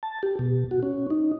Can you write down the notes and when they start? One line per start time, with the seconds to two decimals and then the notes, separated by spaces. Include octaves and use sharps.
0.03 A5
0.23 G4
0.39 B2
0.71 F#4
0.83 C#4
1.10 D#4